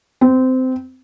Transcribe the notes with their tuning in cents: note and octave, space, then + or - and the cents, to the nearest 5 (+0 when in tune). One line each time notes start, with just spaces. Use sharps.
C4 -20